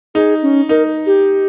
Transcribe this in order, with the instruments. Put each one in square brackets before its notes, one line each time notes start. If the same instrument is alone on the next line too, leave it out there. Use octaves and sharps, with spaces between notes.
[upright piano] D#4 [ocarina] G#4
[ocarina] C#4
[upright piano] D#4 [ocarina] A#4
[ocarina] G4